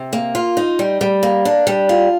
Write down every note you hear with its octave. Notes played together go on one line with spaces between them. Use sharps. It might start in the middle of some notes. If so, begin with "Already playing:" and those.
Already playing: C3
A#3
F4
D#4
G3
G3
A#3
D4
G3
F4